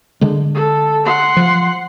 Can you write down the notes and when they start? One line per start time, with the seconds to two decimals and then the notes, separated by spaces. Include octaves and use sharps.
0.21 D3 G#3
0.55 A4
1.06 F#5 C6
1.37 F3